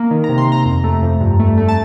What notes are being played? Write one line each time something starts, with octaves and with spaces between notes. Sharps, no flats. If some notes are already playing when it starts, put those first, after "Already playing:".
Already playing: A#3
D#3
A#5
C3
C6
C3 A#5
F2
A3
F2
G2
A3
A3
A5